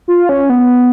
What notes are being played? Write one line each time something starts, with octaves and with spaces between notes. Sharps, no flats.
F4
C#4
B3